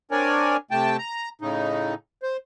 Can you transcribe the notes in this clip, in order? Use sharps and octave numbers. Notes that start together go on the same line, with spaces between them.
C4 D4 A#4 C#5 D5 G#5
C3 A3 G5 A5
A#5
A2 C#3 D#4
C5